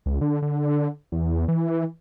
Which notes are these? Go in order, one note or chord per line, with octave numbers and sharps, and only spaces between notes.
C#2
D3
D3
E2
E3